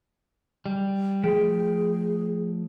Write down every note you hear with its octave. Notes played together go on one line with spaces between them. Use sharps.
G3
F3 A3 G#4 G5